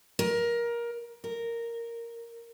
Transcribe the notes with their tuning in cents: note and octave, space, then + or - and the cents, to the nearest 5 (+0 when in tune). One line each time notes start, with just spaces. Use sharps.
A#4 +20
A#4 -5